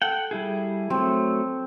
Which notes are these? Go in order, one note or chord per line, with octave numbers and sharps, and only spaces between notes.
A4 F#5 G5
G3 E4 G#4
F#3 A3 C4